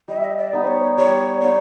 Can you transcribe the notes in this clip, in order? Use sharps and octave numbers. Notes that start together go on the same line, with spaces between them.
G3 D#5
E5
D#5
D5
B3 D#4 G4
C5
C#5
G3 C#5
B3 D#4 C#5